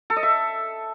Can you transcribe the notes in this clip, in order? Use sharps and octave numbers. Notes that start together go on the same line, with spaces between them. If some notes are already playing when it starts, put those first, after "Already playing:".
A4
D#5
E5